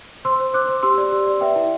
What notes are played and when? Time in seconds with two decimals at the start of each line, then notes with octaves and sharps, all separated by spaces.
0.25 C5 C6 E6
0.39 C5
0.53 C5 D6 F#6
0.68 C5
0.83 G4 C6 E6
0.97 D5
1.12 G4
1.27 D5
1.41 B4 E5 G5
1.56 E4